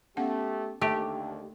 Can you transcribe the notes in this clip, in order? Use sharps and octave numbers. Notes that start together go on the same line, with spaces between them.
A3 B3 C#4 G4 F#5
D#2 D3 A3 G4 E5